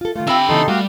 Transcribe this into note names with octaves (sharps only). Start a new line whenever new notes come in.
F4 A4
D#3 A3 F4
D3 C4 G4 E5 B5
C#3 E3 B3 D#4 A4 C6
G3 A3 F#4 F5